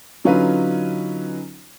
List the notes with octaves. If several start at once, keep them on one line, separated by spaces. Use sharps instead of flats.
D3 F#3 C#4 D#4 F4 B4